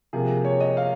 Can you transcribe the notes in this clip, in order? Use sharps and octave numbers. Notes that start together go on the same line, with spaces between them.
C3 F3 A#3 G#4
C#5
D#5
F5